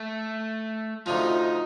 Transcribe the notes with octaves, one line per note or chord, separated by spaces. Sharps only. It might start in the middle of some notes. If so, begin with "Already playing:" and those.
Already playing: A3
D2 C3 F3 D#4